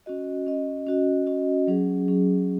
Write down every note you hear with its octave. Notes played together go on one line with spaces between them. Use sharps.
C#4 F#4 D#5
C#4 F#4 D#5
C#4 F#4 D#5
C#4 F#4 D#5
F#3 C#4 G#4
F#3 C#4 G#4